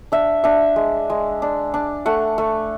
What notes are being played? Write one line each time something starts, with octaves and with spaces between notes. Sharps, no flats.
D4 E5
D4 E5
G#3
G#3
D4
D4
A3 F#5
A3